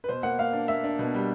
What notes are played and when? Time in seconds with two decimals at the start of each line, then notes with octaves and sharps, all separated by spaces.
0.04 B4
0.09 B2 C5
0.23 A#3 F#5
0.38 A#3 F5
0.53 D4
0.68 A#3 E5
0.84 D4
0.99 B2
1.14 G3